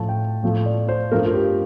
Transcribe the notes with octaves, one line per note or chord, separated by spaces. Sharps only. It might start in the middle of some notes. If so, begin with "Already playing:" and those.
Already playing: A2 F3 A3 A5
G5
A2 F3 A3
D5
C5
G2 F3 A3 A#4
F4
G4